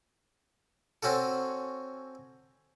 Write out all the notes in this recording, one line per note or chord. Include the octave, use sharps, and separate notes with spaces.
C4 C#4 F#4 A4